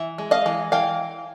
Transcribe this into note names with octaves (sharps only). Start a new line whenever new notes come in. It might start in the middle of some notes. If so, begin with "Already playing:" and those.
Already playing: E3 E5
G#3
D#5 F5
E3
E3 F5 G5